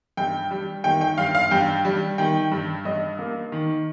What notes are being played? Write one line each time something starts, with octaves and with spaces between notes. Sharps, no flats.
G2 G5
G3
D#3 G5
G5
G2 F5
F5
G2 G5
G3
D#3 G5
G2
G2 D#5
A#3
D#3